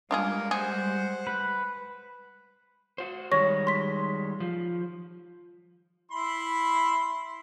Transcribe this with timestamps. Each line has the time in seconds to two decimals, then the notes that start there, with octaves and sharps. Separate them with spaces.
0.11 G3 G#3 A#3 D4 F4 G#4 A#4
0.51 G#4 C5 F#5
1.27 B4
2.98 F#4 C5
3.31 D#3 G3 G#3 C#5 C#6 A#6
3.67 C6 B6
4.40 F3
6.11 E4 B5 C6